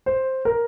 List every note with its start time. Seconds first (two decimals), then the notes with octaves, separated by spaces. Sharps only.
0.06 C5
0.45 A#4